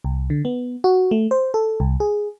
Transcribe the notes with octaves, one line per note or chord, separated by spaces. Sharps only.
C2
D3
B3
F#4
A3
C5
A4
C2
G#4